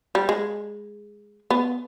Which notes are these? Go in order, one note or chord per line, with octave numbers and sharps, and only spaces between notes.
G3
G#3
B3